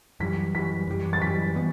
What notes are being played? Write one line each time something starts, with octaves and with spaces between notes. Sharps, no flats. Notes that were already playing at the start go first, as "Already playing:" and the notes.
F#2 E3 G3 B6
F#2 E3 G3 B6
F#2 E3 G3
A6
F#2 E3 G3 B6
E3 G3 B3